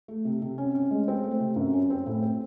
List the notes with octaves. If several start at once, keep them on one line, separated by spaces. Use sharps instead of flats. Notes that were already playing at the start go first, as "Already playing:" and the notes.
A3
C3
C3
C#4
C#4
G#3
C4
A3
C3
F#2
C#4
C4
A2
C4